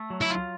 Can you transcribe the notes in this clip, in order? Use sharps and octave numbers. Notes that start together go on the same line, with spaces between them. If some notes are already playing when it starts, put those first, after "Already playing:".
Already playing: A3
F#3
E4
F4